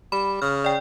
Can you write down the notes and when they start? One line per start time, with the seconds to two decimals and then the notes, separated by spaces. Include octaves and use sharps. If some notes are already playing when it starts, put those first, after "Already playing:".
0.12 G3 B5
0.42 C#3 F6
0.64 D5 G5